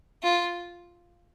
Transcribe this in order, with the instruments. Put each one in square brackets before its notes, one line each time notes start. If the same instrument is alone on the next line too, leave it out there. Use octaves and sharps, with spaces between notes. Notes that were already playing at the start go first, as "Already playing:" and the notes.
[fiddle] F4